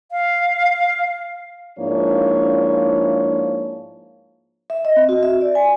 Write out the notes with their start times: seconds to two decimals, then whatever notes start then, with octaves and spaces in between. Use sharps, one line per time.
0.11 F5
1.79 G#2 F3 A#3 D4 E4 C#5
4.70 E5
4.85 D#5
4.96 C4
5.09 F#4
5.23 E5
5.41 D5
5.55 G#5